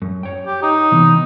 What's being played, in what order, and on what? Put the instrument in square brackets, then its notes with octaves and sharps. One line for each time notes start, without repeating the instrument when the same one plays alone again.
[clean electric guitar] F#2
C#5 G5
[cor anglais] G4
D#4
[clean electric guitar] C3 E3 B3